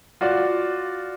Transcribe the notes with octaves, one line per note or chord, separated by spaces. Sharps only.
F4 F#4 D5